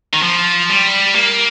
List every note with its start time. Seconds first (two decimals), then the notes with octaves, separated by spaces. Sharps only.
0.13 D#3
0.22 F3
0.70 G3
1.15 A#3